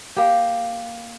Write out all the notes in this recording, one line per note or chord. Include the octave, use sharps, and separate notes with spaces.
A#3 G4